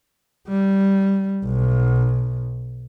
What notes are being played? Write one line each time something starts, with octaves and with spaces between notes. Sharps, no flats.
G3
B1